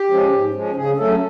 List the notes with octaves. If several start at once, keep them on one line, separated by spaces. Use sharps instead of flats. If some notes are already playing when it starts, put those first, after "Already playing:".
Already playing: G4
F3 G#3 C#4
G#2
F3 G#3 C#4
C#3 G#4
F#3 A3 C#4 A4